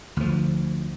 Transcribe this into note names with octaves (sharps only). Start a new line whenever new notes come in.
D2 F3